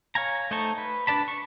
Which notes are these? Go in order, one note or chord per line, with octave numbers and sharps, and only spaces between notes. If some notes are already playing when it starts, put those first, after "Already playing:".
C#5 F5 G#5 A#5
A3 D#4 C5 A5 C#6
B4
D4 B4 D5 A5 B5
C#6